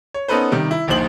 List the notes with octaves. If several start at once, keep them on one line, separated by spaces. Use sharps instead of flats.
C#5
B3 C#4 D#4 A4 B4 C5
C3 D#3 G3
E4
D#1 A#1 D#2 D#3 C5 F#7